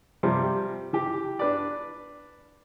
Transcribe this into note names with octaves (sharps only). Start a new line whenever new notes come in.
C3 F3 G3
E3 G4
D4 B4 D5